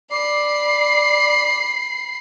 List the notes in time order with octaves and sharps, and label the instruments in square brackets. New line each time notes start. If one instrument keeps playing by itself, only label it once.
[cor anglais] D5 [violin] B5 C7